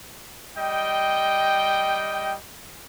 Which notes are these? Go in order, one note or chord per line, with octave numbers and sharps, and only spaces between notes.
G3 D#5 G5